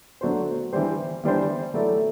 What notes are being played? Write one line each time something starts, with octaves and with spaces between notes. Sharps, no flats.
F#3 A3 D4 F#4 C5
E3 G3 D4 G4 C5
E3 G3 D4 G4 C5
F#3 A3 E4 A4 D5